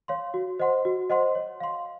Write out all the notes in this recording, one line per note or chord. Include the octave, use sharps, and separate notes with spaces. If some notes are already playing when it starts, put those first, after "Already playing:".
C#5 F5 C6
F#4
C5 D#5 F#5 C6
F#4
C5 D#5 F#5 C6
C#5
F5 C6